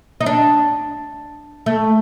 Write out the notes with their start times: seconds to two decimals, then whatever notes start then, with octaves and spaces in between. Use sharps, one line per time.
0.21 D#4
0.26 D4
1.66 A3